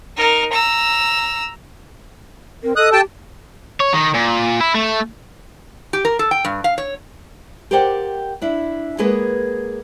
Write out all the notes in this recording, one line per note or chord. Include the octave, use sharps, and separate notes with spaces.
D#4 A#4
A#5 E6
C4 A#4
A4 D#5 D#6 F#6
G4 G5 A5
C#5
D#3
A#2
E4
A3
G4
A#4
A4
G5
G2
F5
C#5
G4 A#4 C5 D5 F#5 G5
D4 E4
G#3 A#3 B3 G#4 B4